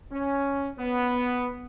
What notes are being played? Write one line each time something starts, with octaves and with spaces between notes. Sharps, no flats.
C#4
B3